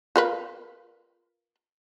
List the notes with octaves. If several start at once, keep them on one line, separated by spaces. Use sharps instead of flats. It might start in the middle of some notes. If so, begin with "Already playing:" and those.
F4 A#4 B4